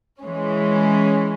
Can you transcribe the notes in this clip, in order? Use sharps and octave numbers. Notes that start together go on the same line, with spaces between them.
E3 G#3 C#4